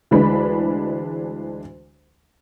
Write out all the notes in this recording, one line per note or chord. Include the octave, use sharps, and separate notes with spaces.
D2 E3 G#3 D4 B5